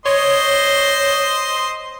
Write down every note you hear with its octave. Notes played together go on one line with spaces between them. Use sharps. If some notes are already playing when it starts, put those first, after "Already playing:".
C5 C#5 D#5 C6